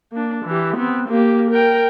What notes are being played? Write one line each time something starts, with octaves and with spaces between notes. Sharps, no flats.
A#3 D4
E3 G4
B3 C4
A#3 G4
A#4 G5